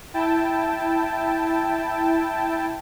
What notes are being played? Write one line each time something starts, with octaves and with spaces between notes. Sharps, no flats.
E4 G5 A5